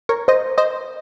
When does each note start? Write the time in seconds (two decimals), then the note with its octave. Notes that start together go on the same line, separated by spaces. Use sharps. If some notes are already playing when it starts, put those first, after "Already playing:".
0.09 A#4 C#5
0.28 C5 D#5
0.58 C5 D#5